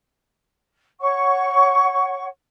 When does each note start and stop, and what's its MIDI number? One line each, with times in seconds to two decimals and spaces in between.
1.00 2.26 73
1.00 2.26 78
1.00 2.26 85